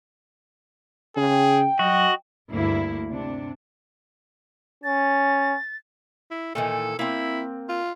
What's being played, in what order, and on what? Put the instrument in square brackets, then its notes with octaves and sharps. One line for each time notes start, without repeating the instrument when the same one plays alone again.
[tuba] C#3 [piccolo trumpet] G#4 [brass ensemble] G5
[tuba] F#3 [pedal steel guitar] F#4 [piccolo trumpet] D#5
[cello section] D2 G2 A#3 E4
C3 D4
[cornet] C#4 [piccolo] A6
[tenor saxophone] E4
[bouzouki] A#2 D#3 E3 [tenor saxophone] A4
[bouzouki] A#3 C4 [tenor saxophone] E4
[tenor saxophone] F4